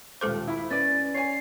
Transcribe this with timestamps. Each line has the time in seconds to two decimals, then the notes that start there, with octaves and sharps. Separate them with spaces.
0.21 D#1 G#3 A4 C5 D6
0.48 E4 B5
0.70 C#4 B4 D5 A6
1.14 C#5 G#5 C7